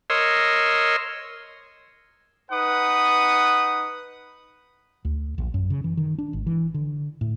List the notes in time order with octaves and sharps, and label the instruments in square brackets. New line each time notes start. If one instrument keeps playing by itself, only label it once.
[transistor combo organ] A#4 C#5 D#5 C6 E6
[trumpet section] D#4 B4 F#5 D#6
[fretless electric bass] D2
A#1
F#2
C#3
E3
D#3
D4
G#1
E3
D3
A2